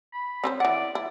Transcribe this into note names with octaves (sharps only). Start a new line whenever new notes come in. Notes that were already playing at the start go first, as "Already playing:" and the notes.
B5
C4 C#4 C5
E3 D5 F#5
E4